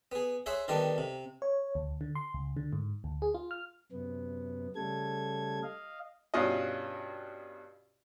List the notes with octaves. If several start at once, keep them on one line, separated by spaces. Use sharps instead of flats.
B3 G#4
G#4 C5 C#5 E5 F#5
D3 D#3 G3 B3 D4
C3
C#5
D2
D3
C6
C#2
D3
G#2
D2
G#4
F4
F6
F#2 C3 B3
C#3 G3 A3 A4 G#6
D#5 F5
G2 B2 C#4 F4 F#4 D#5